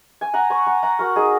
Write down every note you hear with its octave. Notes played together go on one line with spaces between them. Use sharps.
G#5
F#5 A#5
G#5 C#6
F#5 A#5
F#5 A#5
F#4 A#4
D#4 G#4